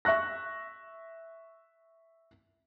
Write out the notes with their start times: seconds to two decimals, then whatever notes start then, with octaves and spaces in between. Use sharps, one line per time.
0.05 E5 C#6 F#6 A#6